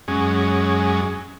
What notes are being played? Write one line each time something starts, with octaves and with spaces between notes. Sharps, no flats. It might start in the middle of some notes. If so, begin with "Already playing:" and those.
F#2 G#3 C#4